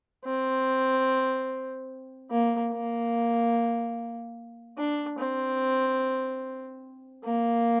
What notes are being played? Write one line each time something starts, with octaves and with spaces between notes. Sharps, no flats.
C4
A#3
A#3
D4
C4
A#3